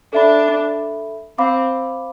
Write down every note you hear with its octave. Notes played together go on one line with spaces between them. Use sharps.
D4 A4 E5 B5
C4 C5 F5 B5 D6